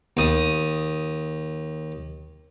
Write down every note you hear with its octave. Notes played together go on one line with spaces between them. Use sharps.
D#2 D#6